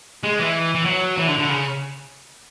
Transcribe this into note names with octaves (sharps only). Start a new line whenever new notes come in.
G#3
E3
E3
F#3
E3
D3
D3
C#3